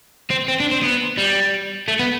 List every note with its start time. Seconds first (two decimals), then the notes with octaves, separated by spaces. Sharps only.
0.31 C4
0.48 C4
0.60 D4
0.72 C4
0.83 B3
1.18 G3
1.88 A3
1.99 B3